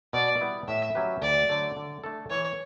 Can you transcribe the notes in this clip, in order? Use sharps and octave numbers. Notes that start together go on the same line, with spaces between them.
B2 D5
G3 B3 E4
A2 E5
F#3 C#4 G4 B4
D2 D5
D3 F#3 A3
D3
A3 D4 A4
E3 C#5